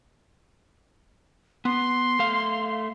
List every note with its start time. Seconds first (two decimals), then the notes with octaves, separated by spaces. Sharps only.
1.65 B3 C6
2.19 A3 F5